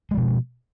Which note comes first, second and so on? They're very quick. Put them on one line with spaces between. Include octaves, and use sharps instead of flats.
G#3 F3 B2